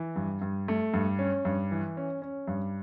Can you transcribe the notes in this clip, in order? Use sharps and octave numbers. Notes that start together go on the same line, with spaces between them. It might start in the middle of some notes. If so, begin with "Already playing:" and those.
Already playing: E3
G2
G2
A3
G2
C#4
G2
E3
C#4
C#4
G2